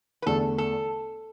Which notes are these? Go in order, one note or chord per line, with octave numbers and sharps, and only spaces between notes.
B4
E2 D3 A3 A4
A4